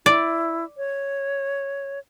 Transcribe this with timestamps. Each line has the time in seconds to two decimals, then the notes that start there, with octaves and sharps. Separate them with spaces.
0.06 E4 D5
0.77 C#5